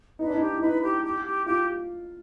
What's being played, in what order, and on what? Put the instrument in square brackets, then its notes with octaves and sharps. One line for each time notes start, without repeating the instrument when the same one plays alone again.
[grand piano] D#4 [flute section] B4
[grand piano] D4
D#4
[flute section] G4
[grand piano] E4
[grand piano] D#4 [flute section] B4
[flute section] G4
G4
G4
[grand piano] F4 [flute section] G4